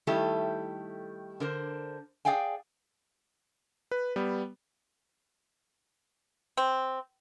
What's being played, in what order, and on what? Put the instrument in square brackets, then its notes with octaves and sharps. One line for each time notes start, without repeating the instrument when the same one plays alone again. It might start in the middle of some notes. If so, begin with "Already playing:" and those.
[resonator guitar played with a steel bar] D#3 G3 A3 E4 G4 A4
D3 A#4 C5
G#4 D5 F5 G5 G#5
[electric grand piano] B4
G3 B3
[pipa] C4